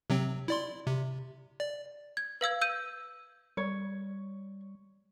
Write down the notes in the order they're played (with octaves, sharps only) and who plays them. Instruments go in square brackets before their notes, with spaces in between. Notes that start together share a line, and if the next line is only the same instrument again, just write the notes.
[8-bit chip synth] C3 F#3 C4
E4 D5 C6
C3
D5
[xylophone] G#6
B4 F5 E6 G#6
E6 G6 D#7
[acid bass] G3 [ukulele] C#5